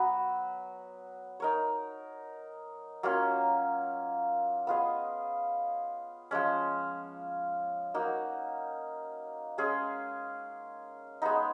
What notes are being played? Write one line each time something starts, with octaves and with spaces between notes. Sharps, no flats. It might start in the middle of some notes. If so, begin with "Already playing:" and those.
Already playing: F#3 B3 F#4 B4
D#4 A#4 C#5
F#3 A#3 C#4 F4
B3 F4 G#4 D#5
F3 G#3 C#4
A#3 D#4 F#4
G#3 C#4 G#4
G#3 B3 D#4